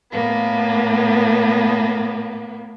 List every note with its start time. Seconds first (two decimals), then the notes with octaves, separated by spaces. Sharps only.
0.10 A2 A#3 B3